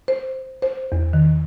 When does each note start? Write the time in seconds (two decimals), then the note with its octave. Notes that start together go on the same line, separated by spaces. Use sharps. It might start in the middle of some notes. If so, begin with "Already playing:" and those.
0.08 C5
0.62 C5
0.92 E2
1.13 D#3